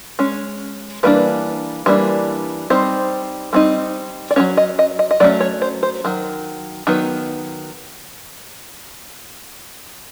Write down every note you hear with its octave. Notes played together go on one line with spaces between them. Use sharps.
G#3 C#4
E3 G3 A#3 D4 B4
E3 G3 A#3 D4
G3 C4 D#4 C5
G3 C4 D#4
D5
F#3 A3 C#4 C#5
D#5
D#5
D#5
D#5
F#3 A3 C#4 D5
C#5
C5
C5
D#3 F#3
D#3 F#3 B3